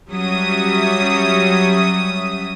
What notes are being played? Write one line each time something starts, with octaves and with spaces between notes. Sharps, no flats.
F#3 G3 C#4 E5 D#6